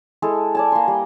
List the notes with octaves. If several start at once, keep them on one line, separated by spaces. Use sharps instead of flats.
G#3 E4 A4
D5 G#5 A5
A#3 C6
G3